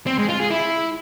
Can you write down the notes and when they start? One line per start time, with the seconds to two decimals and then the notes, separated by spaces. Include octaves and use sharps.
0.07 C4
0.18 G#3
0.29 F4
0.39 G#4
0.50 E4